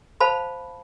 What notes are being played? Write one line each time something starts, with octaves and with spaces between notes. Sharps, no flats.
C5 F5 A5 B5